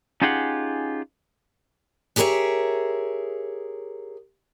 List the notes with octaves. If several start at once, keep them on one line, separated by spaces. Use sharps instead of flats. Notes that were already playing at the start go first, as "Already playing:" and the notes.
C#4 D#4 F4 G4 G#4 F#5
G4 G#4 A#4 C5 C#5 E5